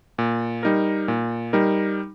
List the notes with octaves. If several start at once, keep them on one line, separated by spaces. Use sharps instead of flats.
A#2
G3 D#4 A#4
A#2
G3 D#4 A#4